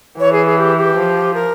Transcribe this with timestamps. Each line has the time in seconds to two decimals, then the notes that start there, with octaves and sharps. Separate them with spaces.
0.20 E3 C#5
0.32 G#4
0.46 G#4
0.58 G4
0.78 G4
0.97 F3
1.34 A#4